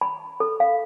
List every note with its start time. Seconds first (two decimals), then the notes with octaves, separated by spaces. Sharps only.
0.01 B5
0.40 A4
0.60 F5